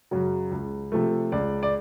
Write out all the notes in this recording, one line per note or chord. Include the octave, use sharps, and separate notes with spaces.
F#2 C#3 F#3
C#2
C3 F3 A3
C#2 D5
D5